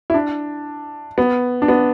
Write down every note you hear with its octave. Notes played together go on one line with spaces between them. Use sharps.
E4
D4
B3
D4
B3